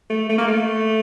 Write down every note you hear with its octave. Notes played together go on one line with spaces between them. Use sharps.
A3
A3
A#3
A3